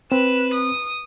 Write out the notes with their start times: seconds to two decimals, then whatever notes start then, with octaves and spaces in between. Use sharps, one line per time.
0.12 C4 B4 E7
0.54 D#6